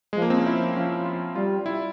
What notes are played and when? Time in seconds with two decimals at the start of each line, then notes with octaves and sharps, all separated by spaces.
0.13 G#3
0.17 F3
0.22 A#3
0.30 C4
0.38 C#4
0.46 E4
0.76 F3 C#4
1.05 F4
1.35 G3 F4
1.66 E4